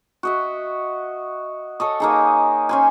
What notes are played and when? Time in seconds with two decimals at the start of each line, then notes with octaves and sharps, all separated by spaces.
0.23 F#4 D#5 E5
1.80 A4 C#5 D#5
2.00 A#3 D#4 G#4
2.69 C#4 C5 G#5